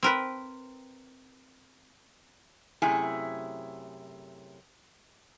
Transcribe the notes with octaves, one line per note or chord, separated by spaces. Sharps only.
C4 A#4 B4
F#2 C3 A3 E4 G#4 G#5